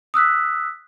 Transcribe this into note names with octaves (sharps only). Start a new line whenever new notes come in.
D#6 E6 F#6 B6